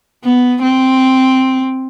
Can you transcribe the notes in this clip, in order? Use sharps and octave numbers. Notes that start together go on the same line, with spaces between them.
B3
C4